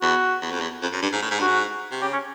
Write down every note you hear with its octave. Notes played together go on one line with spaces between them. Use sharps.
E2 F#4
E2
F2
E2
F2
F#2
G2
G#2
A2
G#2
G2 F#4
G#2
C3
C#3 G4
C#4